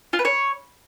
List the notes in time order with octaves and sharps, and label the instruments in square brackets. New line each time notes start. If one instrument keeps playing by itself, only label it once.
[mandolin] F4
B4
C#5